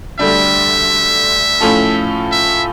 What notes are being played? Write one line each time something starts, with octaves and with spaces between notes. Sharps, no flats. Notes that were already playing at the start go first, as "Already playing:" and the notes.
D2 D3 G3 D4 E5
A2 F3 C#4 F4 A4
E5